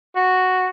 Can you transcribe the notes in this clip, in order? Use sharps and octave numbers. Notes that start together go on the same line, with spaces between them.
F#4